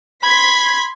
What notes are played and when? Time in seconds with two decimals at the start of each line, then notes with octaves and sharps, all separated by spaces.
0.23 B5 C6 G#6 B6